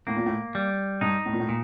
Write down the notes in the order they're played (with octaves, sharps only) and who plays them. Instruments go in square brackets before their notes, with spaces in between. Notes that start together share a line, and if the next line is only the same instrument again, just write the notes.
[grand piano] A2 [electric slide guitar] A#3
[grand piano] A#2
A2
[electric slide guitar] G3
[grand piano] G2 [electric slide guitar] D#4
[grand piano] A2
A#2
A2
[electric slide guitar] A#2